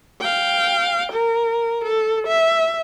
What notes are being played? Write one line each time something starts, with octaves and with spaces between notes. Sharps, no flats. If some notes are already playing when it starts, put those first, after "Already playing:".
F5 G5
A#4
A4
E5